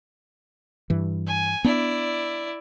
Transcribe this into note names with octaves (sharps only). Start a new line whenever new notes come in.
G2 E3
G#5
B3 D4 E4 D5